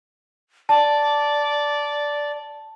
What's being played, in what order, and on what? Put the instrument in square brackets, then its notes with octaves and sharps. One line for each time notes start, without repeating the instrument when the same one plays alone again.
[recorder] D5 [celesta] A5